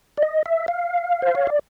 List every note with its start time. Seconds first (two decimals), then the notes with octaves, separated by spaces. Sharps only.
0.18 D5
0.22 D#5
0.46 E5
0.68 F5
1.22 C5
1.35 C#5
1.47 D5